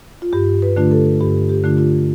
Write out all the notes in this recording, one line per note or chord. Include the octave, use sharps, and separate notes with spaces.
F4
G2 G4
B4
D3 A3 D4 F4
A4
G2 G4
G4
D3 A3 D4 F4
F4